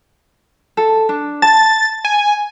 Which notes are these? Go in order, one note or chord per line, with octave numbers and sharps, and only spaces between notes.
A4
D4
A5 A6
G#5